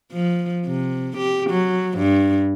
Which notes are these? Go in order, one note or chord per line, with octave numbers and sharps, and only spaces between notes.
F3
C3
G4
F#3
G2